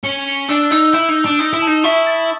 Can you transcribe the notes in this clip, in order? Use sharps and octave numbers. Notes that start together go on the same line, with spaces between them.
C#4 G7
G7
D4 E6
D#4 E6
E4 G6
D#4
G6
D4
D#4 D#6
E4
D#4 A5
E4 C#6
A6